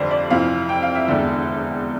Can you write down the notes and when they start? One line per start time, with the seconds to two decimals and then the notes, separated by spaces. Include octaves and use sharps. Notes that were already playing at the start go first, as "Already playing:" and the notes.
Already playing: F1 F2 D3 G3 C5 D5
0.11 D5
0.30 F2 C3 E3 F5
0.69 G5
0.82 F5
0.95 E5
1.08 E1 E2 D3 E5